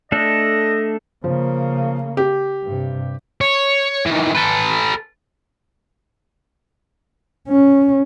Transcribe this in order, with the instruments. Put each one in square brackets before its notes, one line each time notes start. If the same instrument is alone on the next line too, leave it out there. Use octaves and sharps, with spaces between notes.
[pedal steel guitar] A3 D4 A4 [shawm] D#5
[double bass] C#3 A#3 [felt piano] F3
[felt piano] G4
[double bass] G2 C3
[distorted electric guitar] C#5
D#3 E3
A4 B4
[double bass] C#4